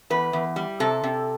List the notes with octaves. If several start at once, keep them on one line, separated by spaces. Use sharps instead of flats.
E2 B4
E2
G3
C3 A4
C3